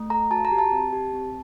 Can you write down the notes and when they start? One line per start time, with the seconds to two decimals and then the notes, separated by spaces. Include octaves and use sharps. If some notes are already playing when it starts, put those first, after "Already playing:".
Already playing: A3
0.10 A4 A#5
0.31 F#4 A5
0.45 A#5
0.51 G4
0.58 A5
0.72 C4
0.93 G4
1.13 C4